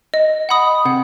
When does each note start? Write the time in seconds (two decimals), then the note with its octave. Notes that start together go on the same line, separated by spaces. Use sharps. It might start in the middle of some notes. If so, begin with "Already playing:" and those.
0.14 D#5
0.49 F#5 B5 D#6
0.85 C3 F#5